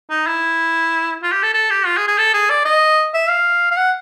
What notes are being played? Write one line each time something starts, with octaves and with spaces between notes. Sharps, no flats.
D#4
E4
F4
G4
A4
A4
G4
F4
G#4
G#4
A4
G#4
D5
D#5
E5
F5
F5
F#5